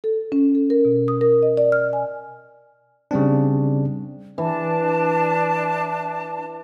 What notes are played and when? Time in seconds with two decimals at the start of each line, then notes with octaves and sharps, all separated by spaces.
0.04 A4
0.32 C#4
0.55 A4
0.70 A#4
0.85 B2
1.08 D#6
1.21 A#4
1.42 D#5
1.57 D5
1.72 F6
1.93 G#5
3.11 C#3 G3 C4 D4
4.38 E3 D4 A5